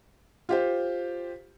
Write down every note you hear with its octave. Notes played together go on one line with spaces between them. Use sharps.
F4 G4 C5